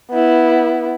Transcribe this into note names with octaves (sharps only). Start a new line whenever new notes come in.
B3 E4